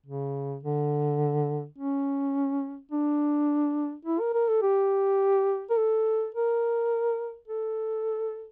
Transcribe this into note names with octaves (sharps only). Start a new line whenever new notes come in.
C#3
D3
C#4
D4
E4
A#4
A#4
A4
G4
A#4
A4
A#4
A4